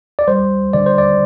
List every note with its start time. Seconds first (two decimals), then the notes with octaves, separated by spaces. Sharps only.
0.19 D5
0.28 G3 C5
0.73 D3 D5
0.86 C5
0.98 D5